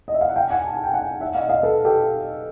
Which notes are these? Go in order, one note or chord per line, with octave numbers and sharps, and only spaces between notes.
D#5
E5
F5
F#5
F5 G5
F#5 G#5
A5
G#5
G5
F#5 G#5
E5 F#5
D#5 F5
D#5 F5
A4 B4
G4 A4